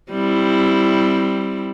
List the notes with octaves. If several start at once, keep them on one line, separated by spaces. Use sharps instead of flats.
G3 C4 E4